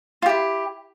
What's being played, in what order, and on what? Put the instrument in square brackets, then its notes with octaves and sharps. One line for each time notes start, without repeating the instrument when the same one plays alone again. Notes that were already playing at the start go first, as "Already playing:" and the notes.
[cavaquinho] F4
G4
E4